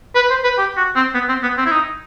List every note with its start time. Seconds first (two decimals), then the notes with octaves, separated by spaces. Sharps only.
0.15 B4
0.30 C5
0.44 B4
0.58 G4
0.77 F#4
0.96 C4
1.14 B3
1.29 C4
1.43 B3
1.58 C4
1.66 E4
1.72 D#4